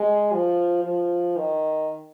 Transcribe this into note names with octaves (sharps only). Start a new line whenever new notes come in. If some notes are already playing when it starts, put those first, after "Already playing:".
Already playing: G#3
F3
F3
D#3